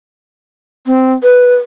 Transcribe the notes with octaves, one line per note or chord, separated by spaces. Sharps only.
C4
B4